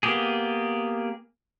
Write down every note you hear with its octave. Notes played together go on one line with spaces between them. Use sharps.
A#3 B3 G4 G#4